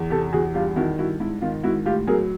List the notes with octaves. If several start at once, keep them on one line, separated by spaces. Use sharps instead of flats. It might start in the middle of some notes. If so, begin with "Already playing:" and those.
Already playing: E2
C3 G4 A4
E2 F#4 G#4
G2 F4 G4
D#3 E4 F#4
G2 E4 F#4
G#2 E4
D#3 F4
G#2 E4 F#4
A2 F4 G4
F#3 G#4 A#4